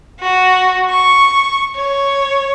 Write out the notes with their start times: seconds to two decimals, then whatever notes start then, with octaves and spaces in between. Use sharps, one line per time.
0.20 F#4
0.90 C#6
1.75 C#5